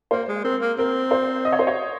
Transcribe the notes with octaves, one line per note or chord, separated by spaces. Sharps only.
A#3 C5
G#3
C4 A#4
A#3
C4 A#4
C5
D#5
C#5
C5
C#5